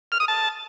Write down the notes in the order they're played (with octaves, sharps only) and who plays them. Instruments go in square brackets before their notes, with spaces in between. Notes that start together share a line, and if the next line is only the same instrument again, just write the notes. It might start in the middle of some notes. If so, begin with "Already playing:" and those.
[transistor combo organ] F6
D#6
A5